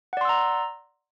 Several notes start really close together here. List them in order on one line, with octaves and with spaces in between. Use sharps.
F#5 D5 C6 E6 A#5